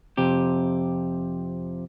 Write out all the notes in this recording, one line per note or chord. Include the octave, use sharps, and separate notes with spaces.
F2 C3 G4